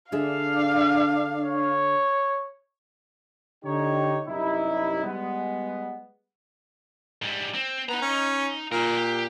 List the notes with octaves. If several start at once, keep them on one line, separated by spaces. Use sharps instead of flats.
D3 D4 G#4 E5 F5
C#5
D3 D#4 G4 C#5
F#2 C3 G3 D#4 E4
G3 G#3 B3
G#2 G3
C4
B3 D#4 A#5
C#4
A#2 G3 A#4
G4